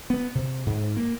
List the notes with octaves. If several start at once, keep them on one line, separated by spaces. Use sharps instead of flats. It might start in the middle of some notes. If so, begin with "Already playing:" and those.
B3
C3
G#2
A#3